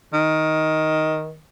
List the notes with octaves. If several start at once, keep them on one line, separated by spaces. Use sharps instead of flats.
D#3